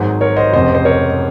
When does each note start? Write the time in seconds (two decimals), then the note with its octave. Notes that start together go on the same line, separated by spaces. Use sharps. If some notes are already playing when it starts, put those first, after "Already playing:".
Already playing: G#1 G#2 F#3 G#4 C5
0.21 A#4 C#5
0.36 C5 D#5
0.53 F1 F2 C#3 G#3 C5 D#5
0.75 C5
0.85 A#4 C#5